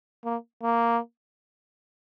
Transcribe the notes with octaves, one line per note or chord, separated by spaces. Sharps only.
A#3
A#3